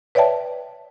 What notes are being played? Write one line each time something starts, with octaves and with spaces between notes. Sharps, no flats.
B4 C#5 D5 E5 G5 A5